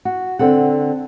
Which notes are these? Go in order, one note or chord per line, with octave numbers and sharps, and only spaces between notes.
F#4
D3 C4 A4 F#5